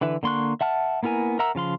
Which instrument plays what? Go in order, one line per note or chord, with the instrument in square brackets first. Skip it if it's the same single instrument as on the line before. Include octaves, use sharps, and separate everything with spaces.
[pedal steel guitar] D3 E3 B4 E5
D3 A#3 C6 C#6 F#6
E5 F#5 A5 F6
A#3 B3 E4 A#4 G#5
A#4 E5 F#5 A#5 E6
C#3 F3 F5 C6